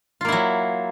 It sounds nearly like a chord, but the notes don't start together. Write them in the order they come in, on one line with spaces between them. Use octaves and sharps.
F4 A#3 E4 F#3